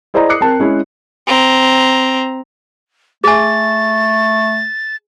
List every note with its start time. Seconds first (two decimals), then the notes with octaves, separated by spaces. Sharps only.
0.14 E4 G#4 C5 D5 D#5 A#5
0.29 D6 D#6 F#6 C7 C#7
0.41 C4 A#4 A5
0.60 G#3 C#4 E4
1.27 C4 A#5
3.24 A3 G#4 G#5 A6